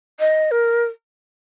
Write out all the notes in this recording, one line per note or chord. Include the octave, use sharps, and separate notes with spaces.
D#5
A#4